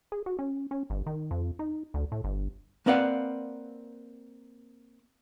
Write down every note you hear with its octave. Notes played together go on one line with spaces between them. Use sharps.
G#4
F#4
C#4
C#4
G1
D#3
F2
D#4
D2
A2
G1
A#3 C4 B4 D5 F5 F#5